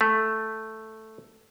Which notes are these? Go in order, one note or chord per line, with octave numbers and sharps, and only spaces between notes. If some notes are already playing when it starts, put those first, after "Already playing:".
A3